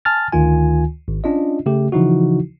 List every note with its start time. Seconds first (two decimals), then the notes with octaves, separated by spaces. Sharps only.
0.05 G#5 A5 F6 A6
0.32 D2 D#3 F4 G#5
1.08 G#1
1.24 C#4 D4 F4 D#5
1.66 C#3 A3 G4
1.92 C#3 E3 F3 D#4 E4 F#4